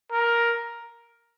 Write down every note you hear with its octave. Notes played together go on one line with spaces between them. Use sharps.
A#4